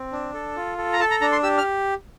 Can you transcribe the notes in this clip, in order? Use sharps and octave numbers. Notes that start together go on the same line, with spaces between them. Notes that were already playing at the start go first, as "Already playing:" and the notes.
Already playing: C4
D4
A4
F4
A4
A#5
A4 A5
A#5
D4 A#5
C6
G4 E6
F6